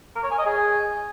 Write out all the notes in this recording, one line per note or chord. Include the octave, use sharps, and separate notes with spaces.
A#4
C#5
G#5
D#5
G#4